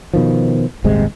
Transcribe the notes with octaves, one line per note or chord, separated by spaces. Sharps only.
B2 D#3 F3
D#1 G#1 C3 G#3